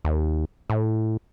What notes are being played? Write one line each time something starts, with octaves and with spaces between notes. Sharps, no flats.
D#2
A2